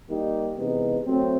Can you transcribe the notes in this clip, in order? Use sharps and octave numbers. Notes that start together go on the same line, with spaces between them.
D#3 G3 A#3 D#4 G4
C3 E3 G#3 B3 D#4
F#3 A3 C4